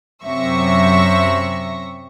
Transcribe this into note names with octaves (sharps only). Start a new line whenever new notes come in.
F#2 C3 E5 C#6 A#6